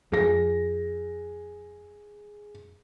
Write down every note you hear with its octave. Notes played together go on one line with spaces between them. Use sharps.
F2 G#4 A#6